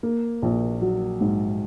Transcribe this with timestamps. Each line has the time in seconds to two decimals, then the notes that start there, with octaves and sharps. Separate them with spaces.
0.03 A#3
0.42 A#1
0.82 F#3
1.21 G#2